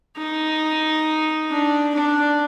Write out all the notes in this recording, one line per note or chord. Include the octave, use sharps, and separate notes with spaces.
D#4
D4
D4